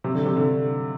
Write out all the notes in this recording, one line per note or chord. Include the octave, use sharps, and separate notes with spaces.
C3
D3
C3
D3